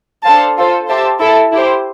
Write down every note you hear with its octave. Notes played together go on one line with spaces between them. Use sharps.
D4 A4 C5 F5 A5
F4 A4 C5
G4 C5 E5 A5
E4 A4 E5 A5
E4 G4 C5